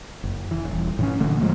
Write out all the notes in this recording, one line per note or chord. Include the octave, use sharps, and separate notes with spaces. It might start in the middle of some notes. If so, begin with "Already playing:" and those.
F#1
E3
D#1
A2 E3 C#4
A#2 D3 A3
A2 F3 G#3 A#3